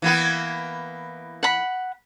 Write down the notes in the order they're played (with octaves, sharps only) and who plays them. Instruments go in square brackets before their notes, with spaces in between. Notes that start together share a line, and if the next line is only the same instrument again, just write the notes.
[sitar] E3 A#3 B3
[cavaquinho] F#5 B5